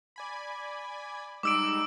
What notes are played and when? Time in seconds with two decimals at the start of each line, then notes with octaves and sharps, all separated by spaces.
0.16 D5 G#5 B5
1.43 G3 G#3 D#4 D6 E6 D7